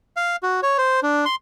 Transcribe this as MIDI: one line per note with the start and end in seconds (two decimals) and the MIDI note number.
0.16 0.36 77
0.43 0.60 66
0.63 0.77 73
0.78 1.00 72
1.03 1.25 62
1.25 1.35 84